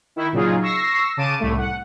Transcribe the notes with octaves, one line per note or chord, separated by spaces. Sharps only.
D#3 E4
A#2 C#3 F#3 D#4 F4 G#4
C#6 E6 A#6 C7
C#3 A5 D6 D#7
C2 A2 A3
F#5